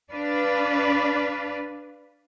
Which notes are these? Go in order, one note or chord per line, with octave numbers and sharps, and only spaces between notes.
D4 B4 D5 F5